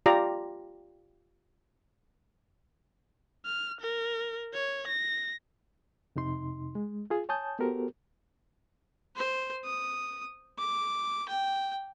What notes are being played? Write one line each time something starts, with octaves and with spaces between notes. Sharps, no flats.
F4 G4 D5 A#5
F6
A#4
C#5
A#6
F2 C3 D#4 C6
G#3
F4 G#4
C#5 G#5 A5 D#6 G6
B3 F#4 G4 A4 A#4 C5
C5
D#6
D6
G5